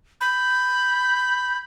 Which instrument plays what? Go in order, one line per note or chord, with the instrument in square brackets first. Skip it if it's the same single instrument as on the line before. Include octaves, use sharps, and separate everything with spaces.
[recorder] B5 [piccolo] G6